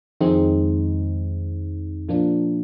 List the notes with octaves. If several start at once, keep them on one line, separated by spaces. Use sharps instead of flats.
F2 D#3 G#3 C4 D#4
A#2 F3 A#3 D4